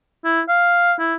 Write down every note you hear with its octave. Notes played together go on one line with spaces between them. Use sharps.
E4
F5
E4